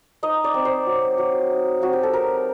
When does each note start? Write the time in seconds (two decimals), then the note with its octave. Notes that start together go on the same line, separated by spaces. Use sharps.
0.23 D#4 D#5
0.44 D5
0.54 C4
0.65 C5
0.86 F#3
1.18 F#3
1.50 D#4
1.82 C4 F#4
1.93 G4
2.03 A4
2.13 F#3 A#4